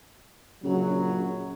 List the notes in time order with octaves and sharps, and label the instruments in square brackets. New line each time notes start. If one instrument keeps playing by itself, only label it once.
[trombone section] A#1 F#3 [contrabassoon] C#3